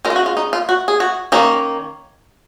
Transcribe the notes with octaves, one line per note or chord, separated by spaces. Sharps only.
G#3 C#4 A#4
F4
F#4
F4
D#4
F4
F#4
G#4
F#4
D#3 A#3 C#4 D#4